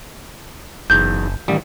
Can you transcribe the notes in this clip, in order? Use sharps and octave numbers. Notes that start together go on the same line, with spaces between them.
F#1 B1 E2 G6
A1 D#3 G3